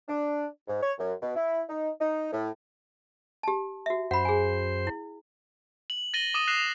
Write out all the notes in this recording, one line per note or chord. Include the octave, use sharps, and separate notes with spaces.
D4
G#2
C#5
F#2
B2
E4
D#4
D#4
A2
G4 A5
F#4 E5
F#2 C5 F#5 B5
G#4 G#5
E4
F#7
A6 A#6 D#7 F#7 G7
D6 D#6 D#7
F#6 A#6 C7 E7 F7